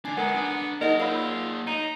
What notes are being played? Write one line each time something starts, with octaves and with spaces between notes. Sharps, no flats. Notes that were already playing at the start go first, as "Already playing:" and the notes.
D3 D4 G#5 G#6 C7
G#3 B3 A#4 F#5 A#5 G#6
D3 D4 D#6
A#3 D#4 G#4 A#4 D#5 F#5 A#6
F4 A#4 C#5 F5 F#5 B5 E6
D#4 A#5 C7